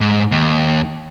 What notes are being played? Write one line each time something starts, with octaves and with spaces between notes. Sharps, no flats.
G#2
D#2